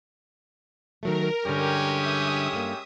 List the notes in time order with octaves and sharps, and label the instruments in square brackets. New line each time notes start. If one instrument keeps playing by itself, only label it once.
[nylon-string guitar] D#3 F#3 A3 [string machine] A#4
[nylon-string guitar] G2 D3 [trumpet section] G#3 C#4 G4
[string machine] E5 D#6
[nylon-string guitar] G2 A#3